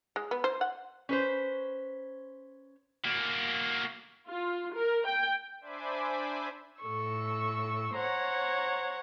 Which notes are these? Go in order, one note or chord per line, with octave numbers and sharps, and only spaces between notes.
G#3
B3
C5
F#5
C#4 B4 C5
A#3 F#4
F4
A#4
G5
D4 C5 E5 G#5 B5 D6
A2 A4 C#6 E6
C5 C#5 F#5 A#5